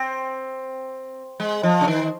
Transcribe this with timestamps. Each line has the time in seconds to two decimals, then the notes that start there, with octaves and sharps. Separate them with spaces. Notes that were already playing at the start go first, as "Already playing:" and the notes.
Already playing: C4
1.40 G#3
1.63 F3
1.81 C#3
1.88 D#3